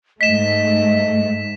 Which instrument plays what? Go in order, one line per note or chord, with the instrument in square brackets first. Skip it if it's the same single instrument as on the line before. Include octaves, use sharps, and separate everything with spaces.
[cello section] G#2 A3 [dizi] D#5 [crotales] B6 E7